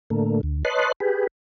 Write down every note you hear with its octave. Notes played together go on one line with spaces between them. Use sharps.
A2 D3 A3 A#3
D2
B4 C#5 D#5 A5 C6 F#6
G4 G#4 B4